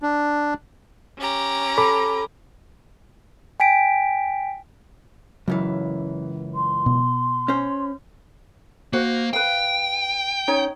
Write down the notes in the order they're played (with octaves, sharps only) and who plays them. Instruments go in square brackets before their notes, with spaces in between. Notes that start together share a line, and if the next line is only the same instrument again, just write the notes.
[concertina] D4
[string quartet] C#4 G4 A#5
[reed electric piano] A4 B5 D6
[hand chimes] G5 G#5 B6 D7
[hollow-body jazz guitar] C#2 F#2 E3 [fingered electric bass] F#3
[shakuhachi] C6
[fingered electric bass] B2
[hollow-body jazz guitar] C#4 C5
[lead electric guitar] A#3 [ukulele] F#4 C5
[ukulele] B4 F5 [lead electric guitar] G5
[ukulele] C#4 D#4 C#5